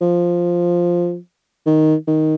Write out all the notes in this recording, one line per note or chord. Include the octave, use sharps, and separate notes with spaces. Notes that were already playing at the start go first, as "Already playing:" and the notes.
F3
D#3
D#3